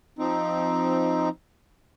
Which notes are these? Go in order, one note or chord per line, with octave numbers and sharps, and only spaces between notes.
F3 C4 D#4